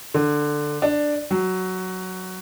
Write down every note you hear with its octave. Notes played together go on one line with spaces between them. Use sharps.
D3
D4
F#3